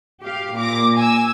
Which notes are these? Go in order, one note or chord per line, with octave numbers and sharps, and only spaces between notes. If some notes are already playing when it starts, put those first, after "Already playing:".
G4 F5
A#2 D6 A#6
G#5 E6